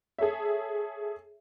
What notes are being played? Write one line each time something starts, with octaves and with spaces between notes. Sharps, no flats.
G#4 A4 C#5 E5